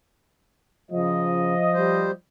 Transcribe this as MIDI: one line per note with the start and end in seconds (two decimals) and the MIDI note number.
0.91 1.54 49
0.91 2.11 53
0.91 2.11 75
1.74 2.11 55
1.74 2.11 72